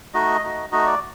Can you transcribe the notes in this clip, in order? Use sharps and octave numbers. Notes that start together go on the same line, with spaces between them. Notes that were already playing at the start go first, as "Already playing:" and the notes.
A3 D#4 F#4 D#5
A3 D#4 F#4
A3 D#4 F#4 D#5
D5